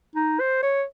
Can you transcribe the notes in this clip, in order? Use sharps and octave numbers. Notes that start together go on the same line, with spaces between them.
D#4
C5
C#5